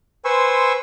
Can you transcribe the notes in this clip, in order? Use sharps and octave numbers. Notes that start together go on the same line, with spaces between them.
B4 C5 G#5 C6 C#6 E6